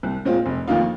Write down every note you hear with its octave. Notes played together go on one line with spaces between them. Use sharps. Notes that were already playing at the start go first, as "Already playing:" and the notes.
C2
A#2 G#3 C4 F4
F1
F2 D#3 A#3 F4